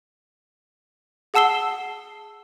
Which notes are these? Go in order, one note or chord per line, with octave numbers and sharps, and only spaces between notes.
G#4 F#5 A5 E6 C7 G7